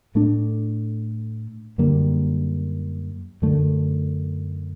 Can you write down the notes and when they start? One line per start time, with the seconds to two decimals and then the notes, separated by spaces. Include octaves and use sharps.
0.15 A2 A3 D4
1.78 F#2 D3 G3 A#3
3.42 F#2 D3 A3